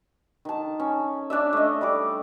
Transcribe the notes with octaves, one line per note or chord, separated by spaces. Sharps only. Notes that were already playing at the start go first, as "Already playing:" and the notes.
D#3 A5
C#4
D4 D5 E5
A3 D#5
G3 D5 D6